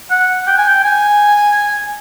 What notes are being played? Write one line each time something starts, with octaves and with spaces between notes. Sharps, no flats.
F#5
G5
G#5
G5
G#5